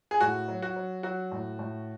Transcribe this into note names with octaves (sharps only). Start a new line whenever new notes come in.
G#4
A2 F#4
F#3
F#4
F#3
F#3 F#4
A2
A2